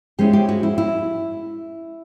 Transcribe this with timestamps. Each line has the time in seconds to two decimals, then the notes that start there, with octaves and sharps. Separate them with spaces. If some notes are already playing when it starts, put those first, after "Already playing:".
0.19 F3 G#3 C#4 E4 G4
0.33 G4
0.49 F#4
0.63 E4
0.78 E4